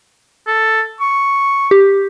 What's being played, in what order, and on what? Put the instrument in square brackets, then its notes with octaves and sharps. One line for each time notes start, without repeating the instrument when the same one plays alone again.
[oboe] A4
C#6
[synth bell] G4